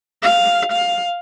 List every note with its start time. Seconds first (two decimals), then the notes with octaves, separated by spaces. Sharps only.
0.23 F5
0.72 F5